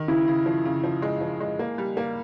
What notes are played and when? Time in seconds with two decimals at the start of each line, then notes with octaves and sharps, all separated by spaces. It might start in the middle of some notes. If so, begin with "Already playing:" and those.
Already playing: D#3
0.08 C#3 E4
0.27 C#3
0.46 F3
0.65 C#3
0.84 F3
1.02 G#3
1.21 F3
1.40 G#3
1.59 A#3
1.78 G3
1.97 A#3